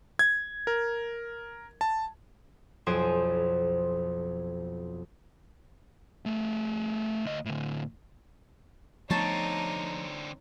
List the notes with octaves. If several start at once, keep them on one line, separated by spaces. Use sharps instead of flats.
G#6
A#4
A5
B1 F2 C5 G#5 D#6 D7
A3 G#4
D2 D#5
A2 D3
D3 F3 A3 B3 C4 D#4 C#5 A5